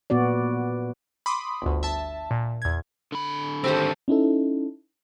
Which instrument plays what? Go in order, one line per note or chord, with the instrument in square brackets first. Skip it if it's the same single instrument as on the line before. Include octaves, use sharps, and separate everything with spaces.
[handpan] A#2 B3 F#4 D5
[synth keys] B5 C6 D6 D#6
G1 D2
E5 A5
A#2
E2 G#6
[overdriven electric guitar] D3 B5
[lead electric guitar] D#3 C4 [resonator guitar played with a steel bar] A3 G4 A4 [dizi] C5
[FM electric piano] C#4 D#4 E4 A4